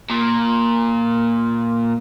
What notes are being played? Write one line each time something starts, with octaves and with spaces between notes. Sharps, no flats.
A#2